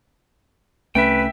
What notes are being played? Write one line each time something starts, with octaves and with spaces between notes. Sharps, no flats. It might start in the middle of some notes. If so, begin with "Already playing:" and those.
C2 A3 C#4 B4 E5 G5